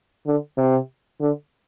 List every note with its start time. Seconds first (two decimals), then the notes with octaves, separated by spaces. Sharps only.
0.26 D3
0.57 C3
1.21 D3